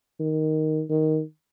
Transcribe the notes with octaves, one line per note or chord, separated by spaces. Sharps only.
D#3
D#3